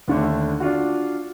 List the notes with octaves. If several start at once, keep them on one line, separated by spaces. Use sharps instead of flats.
D#2 D3 A3
D4 F4 F#4